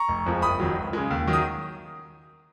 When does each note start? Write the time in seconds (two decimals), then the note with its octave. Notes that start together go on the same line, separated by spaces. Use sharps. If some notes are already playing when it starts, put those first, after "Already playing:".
Already playing: A#5 C#6
0.08 F1
0.26 F2 F3 G#3
0.42 F#1 B5 D#6
0.60 F2 D#3 F#3
0.76 C#2
0.93 C#3 G#3
1.11 D#2
1.27 D#3 F#3
1.33 D#6